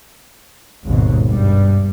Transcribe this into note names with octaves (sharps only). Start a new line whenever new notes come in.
G#1 D#2 B2
G2 G3